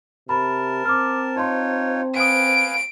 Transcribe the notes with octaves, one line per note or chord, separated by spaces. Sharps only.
C3 A#4 A5 B5
C4 D6 F6
D#4 F4 C#5 A5 C6
B4 F5 G#5 C6 D#6 D7